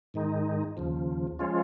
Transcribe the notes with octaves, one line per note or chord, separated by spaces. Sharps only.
G#2 D#3 G#3 D#4
D#2 C#3 F3
F3 G#3 C#4 F4